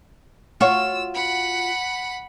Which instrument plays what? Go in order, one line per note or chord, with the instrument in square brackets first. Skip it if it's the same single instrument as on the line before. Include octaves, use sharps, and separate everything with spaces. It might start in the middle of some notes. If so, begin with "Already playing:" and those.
[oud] F4 F#4 C#5 [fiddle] E6
[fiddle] F#5 B5